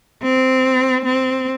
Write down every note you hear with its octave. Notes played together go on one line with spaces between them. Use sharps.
C4
C4